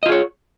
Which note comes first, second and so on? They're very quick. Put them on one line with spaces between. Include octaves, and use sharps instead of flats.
D#5 F4 G#4 C#5